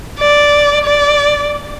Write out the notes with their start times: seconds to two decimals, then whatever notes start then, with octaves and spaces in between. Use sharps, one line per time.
0.19 D5
0.84 D5